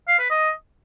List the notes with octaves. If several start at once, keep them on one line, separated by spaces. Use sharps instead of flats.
F5
B4
D#5